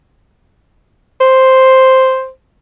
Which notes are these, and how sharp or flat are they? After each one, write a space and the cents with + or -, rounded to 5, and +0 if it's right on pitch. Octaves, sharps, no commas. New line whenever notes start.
C5 +0